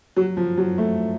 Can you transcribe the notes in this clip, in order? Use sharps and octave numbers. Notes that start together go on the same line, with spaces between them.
F#3
F3
F#3
A3